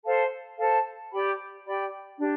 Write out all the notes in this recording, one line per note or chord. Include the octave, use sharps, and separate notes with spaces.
A4 C5 F5 A5
A4 C5 F5 A5
G4 D5 G5 B5
G4 D5 G5 B5
D4 G4